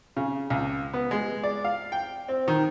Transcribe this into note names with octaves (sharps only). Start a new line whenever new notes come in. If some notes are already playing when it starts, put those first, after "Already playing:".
C#3
C#2
B3
G#3
D5
F5
G5
C4
D#3